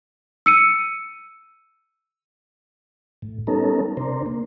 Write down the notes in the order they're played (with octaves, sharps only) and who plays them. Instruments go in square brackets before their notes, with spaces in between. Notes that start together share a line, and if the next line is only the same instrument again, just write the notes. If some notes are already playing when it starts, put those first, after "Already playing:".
[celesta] E6 C#7 D#7
[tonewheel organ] A2
G3 B3 C#4 D#4 A4 A#4
C3 D4 A#4 C5
A#3